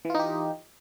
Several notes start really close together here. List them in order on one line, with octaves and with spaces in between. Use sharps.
E3 F4 D#4 G4